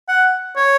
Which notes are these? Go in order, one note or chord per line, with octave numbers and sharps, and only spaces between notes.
F#5
C#5